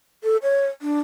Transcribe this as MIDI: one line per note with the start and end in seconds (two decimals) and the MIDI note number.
0.24 0.37 69
0.43 0.67 73
0.82 1.00 62